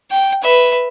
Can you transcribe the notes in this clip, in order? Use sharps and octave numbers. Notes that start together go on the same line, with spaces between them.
G5
B4 E5